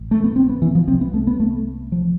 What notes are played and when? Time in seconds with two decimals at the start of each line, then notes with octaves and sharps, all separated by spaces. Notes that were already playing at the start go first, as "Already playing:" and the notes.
Already playing: A1
0.11 A3
0.24 B3
0.36 C4
0.49 B3
0.62 E3
0.75 F3
0.87 C2 C3 C4
1.01 B3
1.14 A3
1.27 B3
1.40 A3
1.92 F3